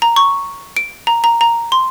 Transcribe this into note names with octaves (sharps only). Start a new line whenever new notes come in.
A#5
C#6
D7
A#5
A#5
A#5
C6